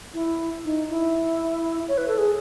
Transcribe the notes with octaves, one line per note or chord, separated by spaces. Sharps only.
E4
D#4
E4
C#5
B4
A4
G#4